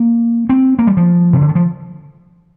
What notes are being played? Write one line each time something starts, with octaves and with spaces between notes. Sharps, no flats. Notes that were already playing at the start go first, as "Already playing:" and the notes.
Already playing: A#3
C4
A#3
G3
F3
C3
D3
D#3
F3